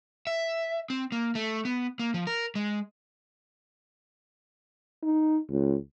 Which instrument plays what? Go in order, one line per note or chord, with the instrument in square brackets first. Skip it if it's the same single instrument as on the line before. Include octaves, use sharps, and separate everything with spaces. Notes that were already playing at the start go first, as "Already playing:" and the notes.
[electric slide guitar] E5
C4
A#3
A3
B3
A#3
F3
A#4
G#3
[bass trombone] D#4
C#2